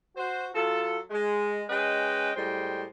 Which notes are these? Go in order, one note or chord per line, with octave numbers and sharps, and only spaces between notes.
F#4 C5
F#3 F4 A4
G#3
G#3 C#4 B4 D#5 G5
A2 G3 G#3 C5 G5